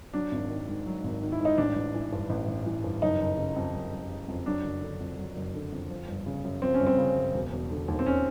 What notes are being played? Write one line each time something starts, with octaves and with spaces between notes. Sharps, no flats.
F#3 D4
G#1
D#3
G#2
F#3
G#1
D#3
E4
G#2
D#4
A1 D4
A1
E3
G2
A1
A1
E3
G2
F#1 D#4
F#1
C#3
F2
F#1
F#1
C#3
F2
F#3 D4
F#1
D3
F2
F#3
F#1
D3
F2
F3
G1
C#3
F#2
F3 C4
C#4
G1
C4
C#3
F#2
E1
E1
D3
D#2
C4
C#4